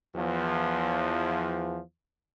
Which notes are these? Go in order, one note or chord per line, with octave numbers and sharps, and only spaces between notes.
E2 F3